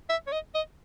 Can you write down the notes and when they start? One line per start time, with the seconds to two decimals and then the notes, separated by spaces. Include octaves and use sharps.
0.09 E5
0.27 C#5
0.32 D#5
0.54 D#5